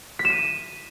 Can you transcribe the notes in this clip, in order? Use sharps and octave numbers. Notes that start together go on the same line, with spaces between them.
B6
E7
D#7